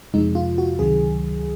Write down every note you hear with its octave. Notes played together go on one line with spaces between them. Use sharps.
F2 C3 F3 G#3 D#4
F4
F#4
C#2 C3 D#3 F#3 G#4